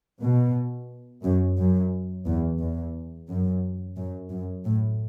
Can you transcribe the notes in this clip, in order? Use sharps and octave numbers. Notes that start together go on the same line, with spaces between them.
B2
F#2
F#2
E2
E2
F#2
F#2
F#2
A2